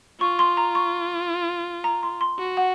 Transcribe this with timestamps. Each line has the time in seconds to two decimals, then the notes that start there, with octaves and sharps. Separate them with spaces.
0.20 F4 C#6
0.39 C6
0.57 A#5
0.75 C#6
1.84 A#5
2.03 C6
2.21 C6
2.39 F#4
2.57 F#5